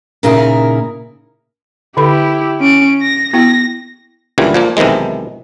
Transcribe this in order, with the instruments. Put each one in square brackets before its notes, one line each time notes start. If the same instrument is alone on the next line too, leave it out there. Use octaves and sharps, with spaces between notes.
[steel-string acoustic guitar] A#2 C#3 D#4 E4 A#4
[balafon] D3 A4 B5 [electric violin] E4 G4
[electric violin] C#4 D7
A#6
[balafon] B3 E4 G5 [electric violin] A#6
[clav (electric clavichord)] C#2 A#2 D3 E3 G3
A#2 F3 A#3
B1 C3 D#3 E3 G#3